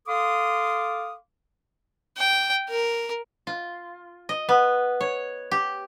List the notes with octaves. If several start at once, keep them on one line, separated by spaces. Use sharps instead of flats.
A4 F5 C6 D6 D#6
G5
A#4
F4
D#5
B3
C#5
G4